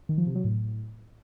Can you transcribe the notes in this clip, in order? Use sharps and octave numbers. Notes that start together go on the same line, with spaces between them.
D#3
F3
C3
F#3
A2